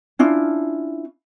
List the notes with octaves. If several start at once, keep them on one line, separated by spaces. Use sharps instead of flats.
C#4 D4 E4 F4